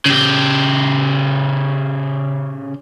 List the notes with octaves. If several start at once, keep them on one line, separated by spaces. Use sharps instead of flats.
C#3 G4